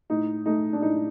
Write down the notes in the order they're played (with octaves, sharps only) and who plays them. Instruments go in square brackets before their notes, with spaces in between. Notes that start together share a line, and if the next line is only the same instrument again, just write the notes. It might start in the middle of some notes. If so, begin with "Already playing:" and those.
[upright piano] A2 D#4
A3 D#4
D4
A2 D#4